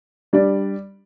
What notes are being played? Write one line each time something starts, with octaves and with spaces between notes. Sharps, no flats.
G3 D4 G4 D5